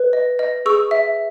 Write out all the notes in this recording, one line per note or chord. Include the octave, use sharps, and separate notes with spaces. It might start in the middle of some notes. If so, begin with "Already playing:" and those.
Already playing: B4
D#5
D#5
G#4 C#6 E6
E5